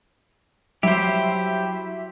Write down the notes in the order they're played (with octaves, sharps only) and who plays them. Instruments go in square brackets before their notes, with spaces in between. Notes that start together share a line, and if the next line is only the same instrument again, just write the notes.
[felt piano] F#3 [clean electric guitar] E4 [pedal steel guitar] G4 C5 [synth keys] E5